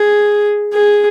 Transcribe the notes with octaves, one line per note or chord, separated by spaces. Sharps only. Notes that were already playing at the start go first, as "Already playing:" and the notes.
Already playing: G#4
G#4